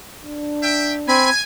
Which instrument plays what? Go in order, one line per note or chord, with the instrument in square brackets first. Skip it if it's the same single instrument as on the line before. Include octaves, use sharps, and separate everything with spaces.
[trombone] D4
[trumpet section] E5 G5
[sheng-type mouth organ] C4 B5 [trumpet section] G#5